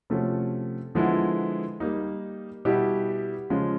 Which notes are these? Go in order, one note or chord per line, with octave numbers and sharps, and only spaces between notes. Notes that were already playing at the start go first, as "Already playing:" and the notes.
C3 F3 A3 C#4 F#4
D3 F3 G#3 B3 E4
G3 A#3 D#4
B2 G3 B3 E4 G4
C#3 F3 G#3 C#4 F4